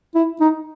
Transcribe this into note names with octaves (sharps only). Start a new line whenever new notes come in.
E4
D#4